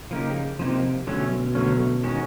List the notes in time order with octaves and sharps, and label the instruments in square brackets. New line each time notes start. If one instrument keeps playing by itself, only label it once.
[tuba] C#3 [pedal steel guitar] F3 A#3 D#4 G4
[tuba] C3 [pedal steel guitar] F3 A#3 D#4 G4
[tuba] B2 [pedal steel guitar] D3 F#3 A3 C#4
[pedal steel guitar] D3 F#3 A3 C#4
D#3 G#3 C#4 F#4